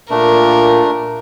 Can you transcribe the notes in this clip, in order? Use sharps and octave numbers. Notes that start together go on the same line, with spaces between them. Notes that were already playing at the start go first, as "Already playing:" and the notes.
A#2 A3 D4 A#4